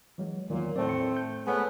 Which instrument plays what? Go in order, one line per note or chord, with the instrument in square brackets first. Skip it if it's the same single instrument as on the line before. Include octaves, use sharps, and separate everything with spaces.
[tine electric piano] E3 F#3 G#3
[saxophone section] E2 A#2 [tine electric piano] D#3 F#3
[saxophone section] A2 A3 C4 [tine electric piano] D5
[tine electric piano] C#7
G6
[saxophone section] G#3 A3 B3 [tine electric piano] C#5 G#5